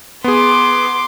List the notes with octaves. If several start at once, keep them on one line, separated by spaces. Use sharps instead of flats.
B3 G#4 C6 D6